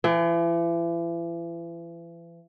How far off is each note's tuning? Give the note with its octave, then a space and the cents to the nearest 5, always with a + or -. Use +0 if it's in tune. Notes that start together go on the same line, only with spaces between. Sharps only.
E3 +40 G5 +0